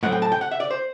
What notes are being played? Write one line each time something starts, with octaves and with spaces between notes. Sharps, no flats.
A2 F#3 C4 F#5
G5
A5
G5
F#5
E5
D5
C5